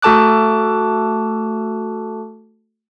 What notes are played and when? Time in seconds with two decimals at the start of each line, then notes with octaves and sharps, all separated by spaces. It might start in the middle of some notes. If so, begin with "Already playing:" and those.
0.02 A3 F#4 A4 A5 D6 F#6